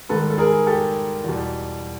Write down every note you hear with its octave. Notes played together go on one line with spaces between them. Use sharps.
G#2 D#3 G3 A4 B4
A4
G#4 A#4
G4 A4
E2 B2 G3